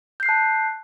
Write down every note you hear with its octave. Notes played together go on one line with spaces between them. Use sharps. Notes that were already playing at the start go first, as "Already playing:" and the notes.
A5 F#6 G6 C7